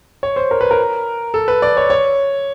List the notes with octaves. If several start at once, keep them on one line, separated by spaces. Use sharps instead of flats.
C#5
C5
A#4
B4
A#4
A4
B4
D5
C#5
C#5